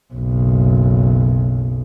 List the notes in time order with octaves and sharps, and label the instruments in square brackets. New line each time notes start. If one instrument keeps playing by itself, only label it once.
[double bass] F#1 B1